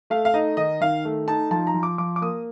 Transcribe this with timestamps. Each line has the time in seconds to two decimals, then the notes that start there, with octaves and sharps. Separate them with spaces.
0.10 A3 F5
0.25 F5
0.34 D#4 D#5
0.57 D#3 D#5
0.81 D#3 F5
1.05 A3
1.28 D#4 A5
1.51 F3 A5
1.67 A#5
1.74 F3
1.83 D6
1.98 F3 D6
2.16 D6
2.22 A#3 D#6